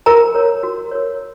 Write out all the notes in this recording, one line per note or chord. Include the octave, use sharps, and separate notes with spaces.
F#4 A#4 A#5
A#4 C#5
F#4
A#4 C#5